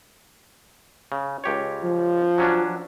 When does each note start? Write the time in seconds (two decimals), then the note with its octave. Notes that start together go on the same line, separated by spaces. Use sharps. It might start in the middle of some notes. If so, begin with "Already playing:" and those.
1.12 C#3
1.44 C#2 G4 C#5
1.83 F3
2.38 F#3 C#4 D4